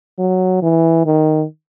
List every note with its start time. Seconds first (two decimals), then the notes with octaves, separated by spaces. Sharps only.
0.19 F#3
0.62 E3
1.06 D#3